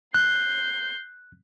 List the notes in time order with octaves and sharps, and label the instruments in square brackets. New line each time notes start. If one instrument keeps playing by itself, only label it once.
[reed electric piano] F#6 [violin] G6 C7